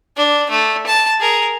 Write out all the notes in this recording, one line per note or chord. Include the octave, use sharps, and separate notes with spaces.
D4
A3
A5
G#4 A#4